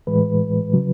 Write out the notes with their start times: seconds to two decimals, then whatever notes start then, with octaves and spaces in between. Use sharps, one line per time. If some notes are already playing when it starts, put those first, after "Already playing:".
0.07 A2 E3 G#3 B4
0.73 C#3 F#3